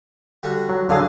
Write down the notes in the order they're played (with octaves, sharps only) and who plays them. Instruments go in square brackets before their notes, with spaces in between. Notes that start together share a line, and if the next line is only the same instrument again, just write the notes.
[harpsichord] D3 G3 F#4
[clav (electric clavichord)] F#3
[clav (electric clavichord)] D3 F#3 G#4 [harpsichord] D4 F4